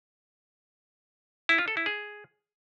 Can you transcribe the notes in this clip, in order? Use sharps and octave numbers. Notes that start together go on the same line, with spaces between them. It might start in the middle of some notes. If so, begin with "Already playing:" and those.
E4
F4
A4
E4
G#4